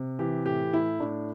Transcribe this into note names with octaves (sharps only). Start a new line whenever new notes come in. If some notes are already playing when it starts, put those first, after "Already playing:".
Already playing: C3
E3 G4
A2 G4
A2 E4
A2 D4